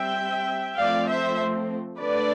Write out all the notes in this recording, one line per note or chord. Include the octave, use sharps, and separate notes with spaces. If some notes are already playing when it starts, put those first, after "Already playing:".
Already playing: G3 C4 E5 G5
F3 A3 C4 D5 F5
C5 E5
D3 A3 D4 B4 D5